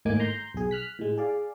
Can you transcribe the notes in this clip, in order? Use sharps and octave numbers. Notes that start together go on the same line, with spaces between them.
G#1 A2 A#3 D#4 G#5 D6
A#5 C6 G6
B1 G#4
F6 F#6 B6
A2 G#3
G#4 D5 F5